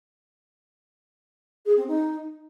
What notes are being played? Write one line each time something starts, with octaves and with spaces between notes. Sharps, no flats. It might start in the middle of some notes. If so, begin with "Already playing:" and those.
G#4
C4
D#4